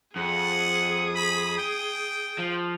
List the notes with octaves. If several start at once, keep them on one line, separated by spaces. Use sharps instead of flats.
F2 G#4 F#5 D#6
B5
G5
F3